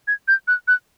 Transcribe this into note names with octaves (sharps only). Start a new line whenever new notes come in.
G#6
G6
F#6
F#6